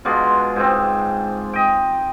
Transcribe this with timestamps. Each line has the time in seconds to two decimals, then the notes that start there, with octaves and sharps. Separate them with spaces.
0.05 B2 G#3 D4 F4
0.56 G#2 C4
1.53 D#5 G5